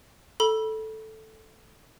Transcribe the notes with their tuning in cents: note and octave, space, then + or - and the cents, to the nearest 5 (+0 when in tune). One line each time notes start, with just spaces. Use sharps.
A4 +0 B5 -30